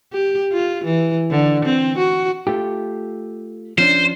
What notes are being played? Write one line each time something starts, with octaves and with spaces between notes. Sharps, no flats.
G4
F4
E3
D3
C4
F#4
A3 F4 G4
F3 C#4 D4 C5